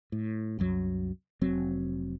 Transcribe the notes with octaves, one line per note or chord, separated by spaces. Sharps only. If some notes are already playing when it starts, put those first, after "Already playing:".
A2
C2 F#2 F#3
F1 F#3 C4